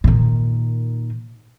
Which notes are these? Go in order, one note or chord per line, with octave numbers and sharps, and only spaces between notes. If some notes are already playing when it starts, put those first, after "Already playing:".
A#2 D#3